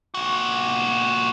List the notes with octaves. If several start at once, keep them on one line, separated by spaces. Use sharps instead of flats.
A#2 F#4